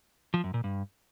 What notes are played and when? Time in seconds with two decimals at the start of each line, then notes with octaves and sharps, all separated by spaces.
0.34 F3
0.44 F#2
0.54 A#2
0.64 G2